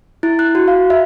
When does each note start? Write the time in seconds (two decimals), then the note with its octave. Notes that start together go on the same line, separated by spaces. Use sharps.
0.23 E4
0.39 F#6
0.55 F#4
0.68 F5
0.90 E5